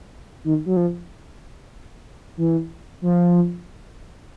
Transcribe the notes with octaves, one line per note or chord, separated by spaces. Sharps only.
D#3
F#3
F3
E3
F3